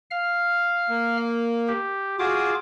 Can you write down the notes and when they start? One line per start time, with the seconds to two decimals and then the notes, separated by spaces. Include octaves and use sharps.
0.11 F5 F6
0.90 A#3
1.68 G4
2.19 F4 F#4 G#4 D6 D#6